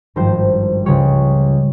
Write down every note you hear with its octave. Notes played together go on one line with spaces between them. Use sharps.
G#1 G2 F3 C5
C#2 C#3 G3 C#5